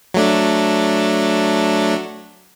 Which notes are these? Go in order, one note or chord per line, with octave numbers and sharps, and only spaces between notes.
F#3 A3 D4